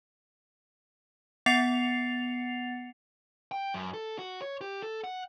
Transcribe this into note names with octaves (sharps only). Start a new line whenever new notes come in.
B3 F#5 A6 C7 C#7 F7
G5
F#2
A4
F#4
C#5
G4
A4
F#5